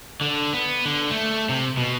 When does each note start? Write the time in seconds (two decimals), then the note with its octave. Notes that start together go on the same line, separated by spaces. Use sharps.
0.21 D3
0.53 B3
0.85 D3
1.11 A3
1.49 C3
1.77 B2